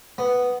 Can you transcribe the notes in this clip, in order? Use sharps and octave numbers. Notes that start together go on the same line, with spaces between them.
B3